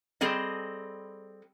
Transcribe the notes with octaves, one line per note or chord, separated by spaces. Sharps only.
G3 C4 G#4 A4 D#5